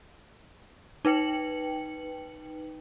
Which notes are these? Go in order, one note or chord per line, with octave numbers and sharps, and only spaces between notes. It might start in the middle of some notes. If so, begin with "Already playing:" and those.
D#4 B4 G5 C#7 F#7